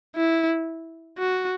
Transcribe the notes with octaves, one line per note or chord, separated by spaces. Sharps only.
E4
F#4